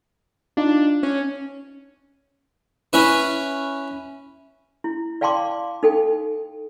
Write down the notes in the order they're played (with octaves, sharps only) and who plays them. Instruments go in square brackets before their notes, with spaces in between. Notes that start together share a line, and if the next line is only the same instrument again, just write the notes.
[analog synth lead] D4 [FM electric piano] D#4 F4
[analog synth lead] C#4 [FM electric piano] C#5
[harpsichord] C#4 E4 B4
[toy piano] E4
D5 F5 G5 A5 C6 D6
D#4 A4 G5